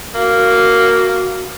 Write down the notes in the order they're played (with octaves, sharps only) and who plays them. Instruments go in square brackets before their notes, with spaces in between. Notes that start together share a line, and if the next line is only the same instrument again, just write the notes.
[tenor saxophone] A#3 [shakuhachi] F#4